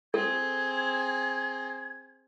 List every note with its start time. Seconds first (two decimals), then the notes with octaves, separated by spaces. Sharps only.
0.14 C4 G#4 A4 G#6